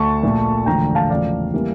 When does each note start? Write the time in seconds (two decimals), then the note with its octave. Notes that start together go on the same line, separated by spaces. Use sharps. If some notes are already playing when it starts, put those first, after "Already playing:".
Already playing: D2 A5 C#6
0.23 A#1 A#2 A3
0.66 E1 D2 D3 F3 A3 G5 A#5
0.95 F5 A5
1.10 E2 C#3 F3 A3 D5 F5
1.54 E3 G3 A#3